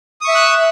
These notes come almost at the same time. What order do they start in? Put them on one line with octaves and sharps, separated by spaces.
D#6 C#6 E5 E6 F#6